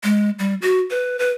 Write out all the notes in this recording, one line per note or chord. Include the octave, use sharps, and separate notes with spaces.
G#3
G3
F#4
B4
B4